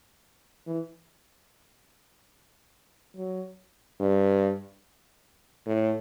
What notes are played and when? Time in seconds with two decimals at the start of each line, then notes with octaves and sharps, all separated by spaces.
0.67 E3
3.16 F#3
4.00 G2
5.66 A2